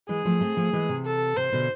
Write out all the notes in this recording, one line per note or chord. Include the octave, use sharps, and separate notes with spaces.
E3 G#3 G#4
F3 A3
A3 C4
F3 A3
E3 G#3
C3
A4
C3 C5
B2 D3